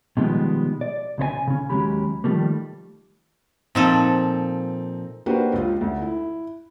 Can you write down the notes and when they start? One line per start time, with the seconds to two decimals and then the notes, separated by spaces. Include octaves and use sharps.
0.17 B2 D#3 F3 G3 G#3 B3
0.81 D5
1.18 B1 C#3 C5 G#5
1.47 C#3 C#4
1.69 D#2 F#3 G#3 C#4 G4 B5
2.24 D#3 F3 G3 A3 A#3
3.75 A#2 F3 C4 D#4 A4
5.26 A#3 D4 F#4 G4 B4 C5
5.53 C#2 F4
5.81 D2
6.02 E4